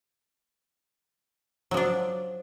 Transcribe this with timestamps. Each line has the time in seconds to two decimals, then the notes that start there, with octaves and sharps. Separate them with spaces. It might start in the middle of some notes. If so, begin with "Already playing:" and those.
1.71 F#3
1.74 F3
1.77 D4